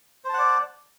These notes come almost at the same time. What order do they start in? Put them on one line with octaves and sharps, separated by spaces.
C5 A5 F#5 D5